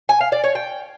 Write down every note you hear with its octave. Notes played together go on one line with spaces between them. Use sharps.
G#5
F5
D5
C#5
G5